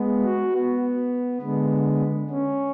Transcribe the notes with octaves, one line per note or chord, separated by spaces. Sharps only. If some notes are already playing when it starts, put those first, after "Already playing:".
Already playing: G#3 B3
F#4
B3
D3 G#3 B3
C#4